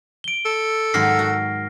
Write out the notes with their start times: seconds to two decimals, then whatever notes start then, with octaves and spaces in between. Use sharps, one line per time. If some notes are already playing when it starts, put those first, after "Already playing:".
0.24 D7 G7
0.46 A4
0.94 G#2 D#3 F#3 F6 A#6 C7
1.19 F#4